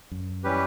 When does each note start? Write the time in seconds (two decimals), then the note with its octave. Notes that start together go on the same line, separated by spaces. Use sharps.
0.11 F#2
0.44 E3 G3 C#4 G4 B4